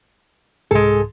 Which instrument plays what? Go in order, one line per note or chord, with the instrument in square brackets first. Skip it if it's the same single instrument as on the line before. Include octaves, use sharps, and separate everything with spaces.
[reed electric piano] C2 G#2 G#4 [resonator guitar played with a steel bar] G#3 A4